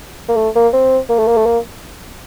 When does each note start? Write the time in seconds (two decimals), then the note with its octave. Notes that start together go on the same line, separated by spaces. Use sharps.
0.29 A#3
0.36 A3
0.56 A#3
0.73 C4
1.09 A#3
1.19 A3
1.27 A#3
1.37 A3
1.46 A#3